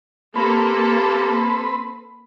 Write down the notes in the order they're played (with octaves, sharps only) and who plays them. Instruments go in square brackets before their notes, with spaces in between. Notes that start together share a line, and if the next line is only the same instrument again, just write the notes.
[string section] A#3 A4 [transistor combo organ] C4 B4 [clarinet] G4 [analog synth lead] B5